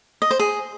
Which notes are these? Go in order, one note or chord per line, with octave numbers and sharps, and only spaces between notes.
D#5
C5
G#4